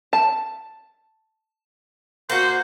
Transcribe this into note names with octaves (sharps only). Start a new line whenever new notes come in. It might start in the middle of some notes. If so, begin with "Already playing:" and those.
A5
A#3 F#4 C5